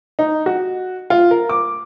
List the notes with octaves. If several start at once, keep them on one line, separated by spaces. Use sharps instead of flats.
D#4
F#4
F4
A#4
D6